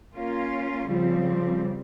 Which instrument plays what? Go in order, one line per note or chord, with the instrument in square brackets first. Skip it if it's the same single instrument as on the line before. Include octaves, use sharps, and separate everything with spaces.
[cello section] A#3 C#4 F4
[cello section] C#3 G3 C4 [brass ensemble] F3